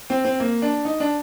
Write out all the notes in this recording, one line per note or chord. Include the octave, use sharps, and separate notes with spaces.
C4
C4
A#3
D4
D#4
D4